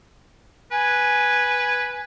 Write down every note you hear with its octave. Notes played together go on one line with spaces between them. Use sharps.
B4 G#5